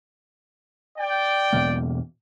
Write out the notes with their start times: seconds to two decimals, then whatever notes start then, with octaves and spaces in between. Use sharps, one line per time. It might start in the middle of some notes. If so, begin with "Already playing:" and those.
0.98 D5 G5
1.53 E2 B2 A#3